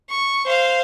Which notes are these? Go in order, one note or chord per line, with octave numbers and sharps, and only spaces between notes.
C#6
C5 F5